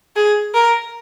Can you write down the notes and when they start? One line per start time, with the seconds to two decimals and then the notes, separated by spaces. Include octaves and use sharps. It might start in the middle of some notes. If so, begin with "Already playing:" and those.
0.16 G#4
0.54 A#4